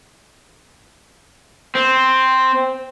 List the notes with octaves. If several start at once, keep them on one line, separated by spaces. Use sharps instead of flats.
C4